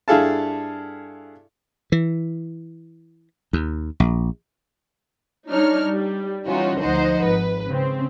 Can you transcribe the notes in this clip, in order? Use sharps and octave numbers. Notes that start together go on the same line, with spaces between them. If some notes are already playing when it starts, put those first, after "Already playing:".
G2 E4 G#4 A4 F5 A5
E3
D#2
A#1
G3 D4 D#4 C#5 F6
G3
E3 G3 C#4 D#4 F4 F#4
D2 F3 D#4 C5 D#5 F#5
G#1 B4
C#3 C4